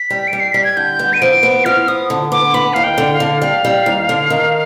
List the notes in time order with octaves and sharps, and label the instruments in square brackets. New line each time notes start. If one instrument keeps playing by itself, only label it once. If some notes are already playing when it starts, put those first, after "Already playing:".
Already playing: [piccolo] B6
[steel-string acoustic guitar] G3
[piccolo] D7
[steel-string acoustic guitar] G3
[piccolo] C7
[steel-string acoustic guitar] G3 [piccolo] B6
[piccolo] G#6
[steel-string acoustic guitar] D3 [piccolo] G6
[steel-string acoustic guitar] B3
[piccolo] D#7
[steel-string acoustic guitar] F3 [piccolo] D7
[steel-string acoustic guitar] B3
[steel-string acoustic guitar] F3 [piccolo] F6
[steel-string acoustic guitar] B3 [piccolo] D#6
[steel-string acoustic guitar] D3
[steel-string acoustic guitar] B3 [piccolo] D6
[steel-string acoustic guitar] B3 [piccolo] B5
[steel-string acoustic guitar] D#2 [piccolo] F5
[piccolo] G5
[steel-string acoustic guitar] D3
[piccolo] F5
[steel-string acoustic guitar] D3
[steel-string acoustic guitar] G3 [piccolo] F5
[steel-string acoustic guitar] G3
D#2
D3
D#3